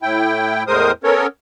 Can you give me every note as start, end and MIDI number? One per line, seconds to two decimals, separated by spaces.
0.02 0.63 45
0.02 0.63 64
0.02 0.63 79
0.67 0.92 40
0.67 0.92 45
0.67 0.92 56
0.67 0.92 70
0.67 0.92 72
0.67 0.92 87
1.04 1.27 59
1.04 1.27 61
1.04 1.27 69
1.04 1.27 70
1.04 1.27 73